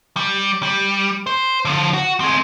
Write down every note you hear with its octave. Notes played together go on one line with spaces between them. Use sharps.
G3
G3
C5
D3 F3
F#4
C4 G#4